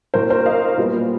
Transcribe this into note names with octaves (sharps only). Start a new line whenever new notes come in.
A2 F#3 A#3 A#4 C5
A#4 C5
D#5 F5
A#2 G3 B3